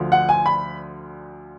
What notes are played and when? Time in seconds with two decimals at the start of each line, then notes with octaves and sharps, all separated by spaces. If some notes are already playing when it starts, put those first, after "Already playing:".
Already playing: D2 D3 F3
0.12 F#5
0.29 G#5
0.46 B5